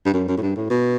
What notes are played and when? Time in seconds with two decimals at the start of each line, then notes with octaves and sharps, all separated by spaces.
0.06 G2
0.13 F#2
0.28 F#2
0.37 A2
0.42 G2
0.56 A2
0.70 B2